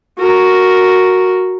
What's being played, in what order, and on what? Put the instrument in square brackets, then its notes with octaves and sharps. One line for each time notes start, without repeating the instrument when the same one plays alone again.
[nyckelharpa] F#4 A#4